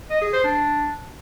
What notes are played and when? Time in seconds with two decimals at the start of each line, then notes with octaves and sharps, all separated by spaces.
0.10 D#5
0.21 G#4
0.33 C5
0.44 D4